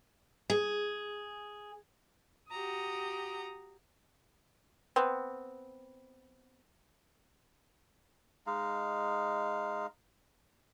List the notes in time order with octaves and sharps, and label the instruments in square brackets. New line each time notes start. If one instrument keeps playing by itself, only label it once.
[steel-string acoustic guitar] G#4
[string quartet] F#4 G4 A#5 D#6
[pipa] B3 C4
[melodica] G#3 D#4 F5